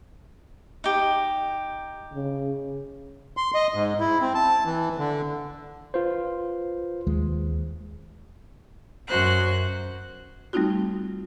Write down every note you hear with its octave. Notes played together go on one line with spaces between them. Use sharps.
D#4 G4
C#3
C6
D#5
G#2
E4
C4
A5
E3
D3
F4 B4 C5
D#2 G#3
F#2 F#4 C5 F#6
G3 A3 C4 D#4 F4 F#4